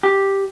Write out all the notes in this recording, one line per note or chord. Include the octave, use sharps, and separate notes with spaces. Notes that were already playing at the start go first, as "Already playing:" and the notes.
G4